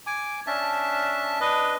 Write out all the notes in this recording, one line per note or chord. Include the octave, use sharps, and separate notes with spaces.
G#5 D6
C#4 D4 E5 A5
D4 B4 D#5